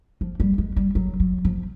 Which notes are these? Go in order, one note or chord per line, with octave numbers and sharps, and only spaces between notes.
F3
G3
G#3
G3
F#3
F#3
F3